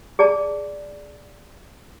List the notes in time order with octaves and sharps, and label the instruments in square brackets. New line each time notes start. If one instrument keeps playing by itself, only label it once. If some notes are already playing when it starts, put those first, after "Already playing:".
[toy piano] G#4 D5 A5